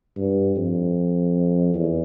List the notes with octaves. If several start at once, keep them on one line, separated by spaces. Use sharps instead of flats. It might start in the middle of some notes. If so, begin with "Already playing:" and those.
G2
F2
E2